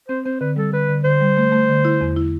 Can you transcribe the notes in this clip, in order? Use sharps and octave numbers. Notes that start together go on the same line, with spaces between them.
C4 C5
C4 C5
D3 B4
G3 A4
D3 B4
D3
D3 C5
G3
A3
A3
D3
E4
E2
E4